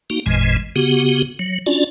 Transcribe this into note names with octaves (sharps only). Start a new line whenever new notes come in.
A#3 D#4 F#4
G#1 F2 A#2 E3 G#3
C#3 B3 F#4 G4
F#3
C#4 D4 F4 F#4 D5